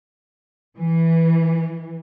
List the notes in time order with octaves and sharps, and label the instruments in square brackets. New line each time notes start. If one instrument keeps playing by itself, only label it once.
[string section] E3